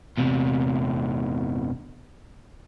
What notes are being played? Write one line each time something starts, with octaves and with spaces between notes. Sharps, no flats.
E2 C3